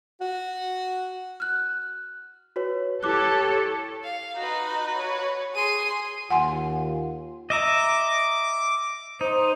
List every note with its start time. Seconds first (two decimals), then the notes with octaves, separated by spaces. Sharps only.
0.21 F#4
1.40 F6 F#6
2.56 F#4 B4 C#5
3.03 E4 G4 A4 C#5 D6 F#6
4.04 F5
4.37 D#4 F#4 B4
4.96 C#5
5.55 G#4 C6 D#7
6.30 D#2 F4 F#5 G#5 C6
7.50 D#5 E5 A#5 D6
9.21 D#4 C5